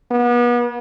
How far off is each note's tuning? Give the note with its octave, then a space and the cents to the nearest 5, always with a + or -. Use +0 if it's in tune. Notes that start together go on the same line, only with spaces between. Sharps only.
B3 -35